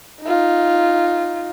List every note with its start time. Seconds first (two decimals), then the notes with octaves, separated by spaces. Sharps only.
0.23 D#4 F4